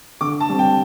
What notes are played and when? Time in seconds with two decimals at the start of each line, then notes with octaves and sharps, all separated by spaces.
0.21 D3 D6
0.40 A5
0.49 G3 C4
0.59 G5